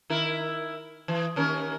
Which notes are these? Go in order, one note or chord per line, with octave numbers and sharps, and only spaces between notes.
D#3 E4 A#4
E3
D#2 C#4 A#4